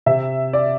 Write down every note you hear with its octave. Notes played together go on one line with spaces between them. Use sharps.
C3 E5
D5